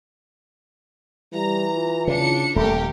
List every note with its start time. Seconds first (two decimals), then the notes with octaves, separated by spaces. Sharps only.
1.33 E3 G3 A#5
1.75 F4
2.07 C#3 D4 C#7
2.56 D#1 A3 G4 A#4